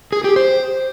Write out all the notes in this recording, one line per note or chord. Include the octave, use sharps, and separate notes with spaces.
G#4
G4
C5